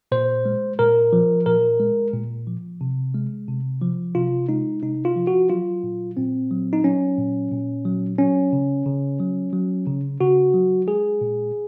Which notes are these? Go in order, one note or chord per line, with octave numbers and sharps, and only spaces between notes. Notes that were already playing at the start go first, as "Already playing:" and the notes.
A#2 C5
G#3
A#2 A#4
F3
A#2 A#4
G#3
A#2
F3
C3
G#3
C3
F3
C3 F4
G#3 D#4
C3 D#4
F4
F3
F#4
F#3 F4
A#2
A#2 C4
F#3
D#4
F#3 C#4
A#2
A#2
F#3
F#3 C#4
C#3
C#3
F#3
F#3
C#3
C#3 F#4
F#3
G#3 G#4
A#2